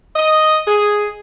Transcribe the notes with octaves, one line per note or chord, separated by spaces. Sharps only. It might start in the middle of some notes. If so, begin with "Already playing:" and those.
D#5
G#4